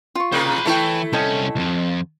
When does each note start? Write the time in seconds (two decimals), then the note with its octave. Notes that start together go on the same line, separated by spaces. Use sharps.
0.15 F4 C#6
0.32 C3 A#3 C5 B5
0.65 E3 A3 E4 A4 C#5 G5
1.13 C2 C#4 A4 D#5 G5
1.56 C2 F2